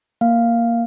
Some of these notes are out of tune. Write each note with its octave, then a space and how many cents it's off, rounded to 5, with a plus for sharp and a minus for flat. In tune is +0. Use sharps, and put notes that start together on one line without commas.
A#3 +0 F5 +0